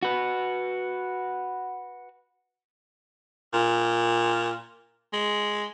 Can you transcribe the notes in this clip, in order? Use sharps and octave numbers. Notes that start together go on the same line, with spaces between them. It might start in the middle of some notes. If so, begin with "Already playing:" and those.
F#4 B4
A#2
G#3